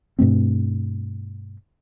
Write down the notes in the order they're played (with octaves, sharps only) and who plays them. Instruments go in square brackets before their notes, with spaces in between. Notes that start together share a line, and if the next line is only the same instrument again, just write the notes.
[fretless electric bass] G2 B2 A3 C4